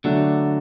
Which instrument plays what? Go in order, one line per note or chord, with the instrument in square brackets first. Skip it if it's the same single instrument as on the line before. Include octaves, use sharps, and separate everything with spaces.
[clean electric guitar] D3 [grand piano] F#3 A3 D4